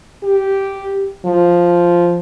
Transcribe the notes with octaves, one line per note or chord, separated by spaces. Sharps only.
G4
F3